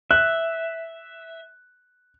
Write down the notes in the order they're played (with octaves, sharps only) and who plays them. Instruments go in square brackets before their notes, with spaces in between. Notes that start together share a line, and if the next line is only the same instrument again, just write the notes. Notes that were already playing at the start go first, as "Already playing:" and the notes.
[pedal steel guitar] E5 [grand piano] F#6